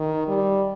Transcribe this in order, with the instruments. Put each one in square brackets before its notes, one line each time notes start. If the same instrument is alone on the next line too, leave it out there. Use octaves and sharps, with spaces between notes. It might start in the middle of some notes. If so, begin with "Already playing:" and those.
Already playing: [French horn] D#3
G3